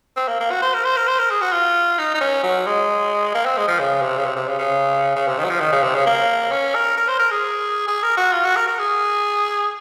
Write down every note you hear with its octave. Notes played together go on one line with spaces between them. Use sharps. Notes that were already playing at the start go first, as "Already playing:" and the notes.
C4
A#3
A#3
F#4
C5
A#4
C5
A#4
C5
A#4
G#4
F#4
F4
D#4
D#4
C#4
F#3
G#3
A#3
C4
G#3
F3
C#3
C3
C#3
C3
C3
C#3
C#3
C#3
C3
D#3
F#3
F3
D#3
C#3
C3
C#3
A#3
C#4
A#4
A#4
C5
A#4
G#4
G#4
A#4
F#4
F4
F#4
A#4
A#4
G#4